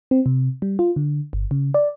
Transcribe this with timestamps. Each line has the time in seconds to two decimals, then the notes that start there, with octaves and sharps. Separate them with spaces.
0.11 C4
0.26 C3
0.62 G3
0.79 F4
0.96 D3
1.33 G1
1.51 C#3
1.74 D5